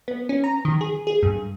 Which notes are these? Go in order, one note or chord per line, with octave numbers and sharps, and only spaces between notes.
B3
C#4
A#5
D#3
G#4
G#4
G2